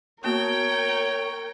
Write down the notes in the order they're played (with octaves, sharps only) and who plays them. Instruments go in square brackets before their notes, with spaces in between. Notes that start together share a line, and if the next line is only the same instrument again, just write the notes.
[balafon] A#3 B3 F#4 [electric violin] A#4 [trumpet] C#5 [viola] G5